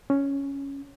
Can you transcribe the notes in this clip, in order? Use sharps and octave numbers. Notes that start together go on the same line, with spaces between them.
C#4